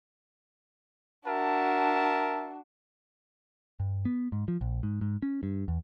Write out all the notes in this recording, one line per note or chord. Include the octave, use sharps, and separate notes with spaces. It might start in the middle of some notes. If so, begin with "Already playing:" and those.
D4 F#4 A#4 E5 A5
G2
B3
G#2
F3
A#1
G#2
G#2
C#4
G2
E2